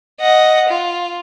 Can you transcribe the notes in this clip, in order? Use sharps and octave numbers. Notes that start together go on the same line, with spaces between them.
D#5 F#5
F4